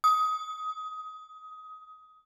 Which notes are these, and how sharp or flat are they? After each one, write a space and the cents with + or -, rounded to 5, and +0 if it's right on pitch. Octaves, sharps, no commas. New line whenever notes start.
D#6 +20